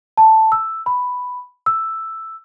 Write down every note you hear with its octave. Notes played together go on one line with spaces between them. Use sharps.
A5
E6
B5
E6